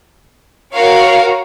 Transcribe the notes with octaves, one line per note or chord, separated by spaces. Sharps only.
F#4 A#4 C#5 F5